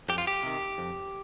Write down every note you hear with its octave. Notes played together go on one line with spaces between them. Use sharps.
F2 G4
F4
G4
C3 D#3
F2